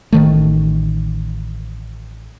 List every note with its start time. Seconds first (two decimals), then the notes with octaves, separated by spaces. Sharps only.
0.13 A1 D#3 A3